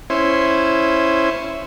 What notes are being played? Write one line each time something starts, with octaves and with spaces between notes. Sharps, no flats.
C#4 E4 C5